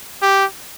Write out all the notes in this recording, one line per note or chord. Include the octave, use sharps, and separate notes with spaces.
G4